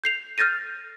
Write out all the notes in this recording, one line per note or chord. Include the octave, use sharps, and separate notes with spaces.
G6 C7 F7
F6 G6 A6 A#6 D#7